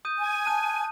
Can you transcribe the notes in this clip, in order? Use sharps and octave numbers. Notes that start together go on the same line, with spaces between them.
D#6 G6 D#7
G#5
A5 F#6 D#7